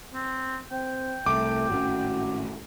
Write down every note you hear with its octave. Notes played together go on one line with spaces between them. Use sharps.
C4
C4 G5
C2 A3 D6
G#1 A2 C#4 F#4